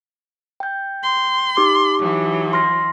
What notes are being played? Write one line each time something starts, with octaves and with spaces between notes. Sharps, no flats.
G5 G6
C6
D#4 G4 D6
E3 F#3
C6 F6 A#6